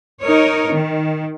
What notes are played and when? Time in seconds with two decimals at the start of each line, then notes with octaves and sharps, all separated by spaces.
0.22 D#4 A#4 C#5
0.71 D#3